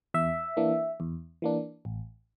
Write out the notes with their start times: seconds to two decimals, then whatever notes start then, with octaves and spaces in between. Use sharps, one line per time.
0.14 E2 E5
0.57 E3 A#3 D4
1.00 E2
1.42 E3 A#3 D4
1.85 A1